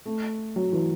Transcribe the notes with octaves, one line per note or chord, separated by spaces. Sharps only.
A3
F#3
E3